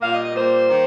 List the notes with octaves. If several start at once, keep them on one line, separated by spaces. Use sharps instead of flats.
A#2 G3 A#3 F5
D#5
D#5
A#2 G3 A#3 C5
D#3 A#3